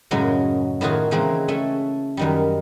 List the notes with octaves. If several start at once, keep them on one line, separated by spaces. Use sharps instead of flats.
F#2 A2 C#3 F#3 G#3
A2 D#3 F4 F#4 G#4 F5
C#3 E3 G#3 A#3 C4
A3 C#4 A4
F#2 D#3 G3